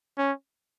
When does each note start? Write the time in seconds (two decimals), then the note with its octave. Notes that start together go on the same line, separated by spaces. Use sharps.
0.18 C#4